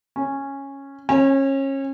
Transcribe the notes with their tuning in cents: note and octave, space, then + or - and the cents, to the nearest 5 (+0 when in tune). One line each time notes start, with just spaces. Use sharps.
C#4 -10
C#4 -30